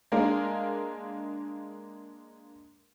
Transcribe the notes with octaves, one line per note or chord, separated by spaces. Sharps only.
G#3 A#3 D4 A#4 F5